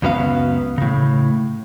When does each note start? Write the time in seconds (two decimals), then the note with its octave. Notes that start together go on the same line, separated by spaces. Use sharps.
0.02 C#2 F#2 F#3 B3 C#4 F5
0.78 A2 C#3